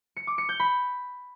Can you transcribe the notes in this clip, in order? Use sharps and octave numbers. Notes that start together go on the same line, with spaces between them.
C#7
D6
C#7
G6
B5